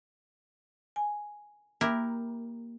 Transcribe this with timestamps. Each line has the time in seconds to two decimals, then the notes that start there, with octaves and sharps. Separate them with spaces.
0.96 G#5
1.81 A#3 E4 G4 A#4